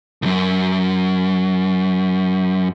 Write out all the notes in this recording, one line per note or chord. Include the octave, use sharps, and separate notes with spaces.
C2 F#2